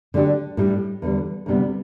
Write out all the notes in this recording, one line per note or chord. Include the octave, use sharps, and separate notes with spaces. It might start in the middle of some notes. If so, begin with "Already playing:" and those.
D3 A3 D4 G4
A2 G3 D4
E2 D3 G3
D2 C3 G3 B3